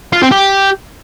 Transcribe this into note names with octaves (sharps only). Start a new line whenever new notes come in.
F4
C4
G4